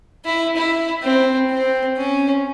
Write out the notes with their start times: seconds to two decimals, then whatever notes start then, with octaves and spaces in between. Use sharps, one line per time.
0.25 E4
0.57 E4
1.03 C4
1.51 C4
1.97 C#4